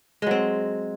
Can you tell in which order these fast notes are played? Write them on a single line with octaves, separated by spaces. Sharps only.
G#3 F#3 C4